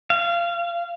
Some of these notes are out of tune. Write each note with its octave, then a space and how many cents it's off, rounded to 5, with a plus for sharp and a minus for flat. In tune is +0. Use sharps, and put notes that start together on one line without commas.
F5 -25